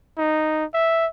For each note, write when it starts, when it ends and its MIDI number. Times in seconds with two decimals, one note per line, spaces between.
0.18 0.65 63
0.74 1.07 76